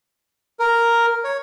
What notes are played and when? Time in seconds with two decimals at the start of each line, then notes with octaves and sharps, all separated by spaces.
0.59 A#4
1.24 C#5